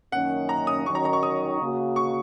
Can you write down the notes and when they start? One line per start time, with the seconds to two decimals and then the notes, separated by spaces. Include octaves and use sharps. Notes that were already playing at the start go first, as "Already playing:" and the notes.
0.12 F#2 D#3 A#3 C#4 F#5
0.49 A#5
0.67 D#6
0.86 D#3 F#3 C#4 C#6
0.95 A#5
1.05 A#5
1.13 C#6
1.23 D#6
1.59 C#3 A#3 F#4
1.96 C#6